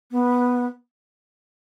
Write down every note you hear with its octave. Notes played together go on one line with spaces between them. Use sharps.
B3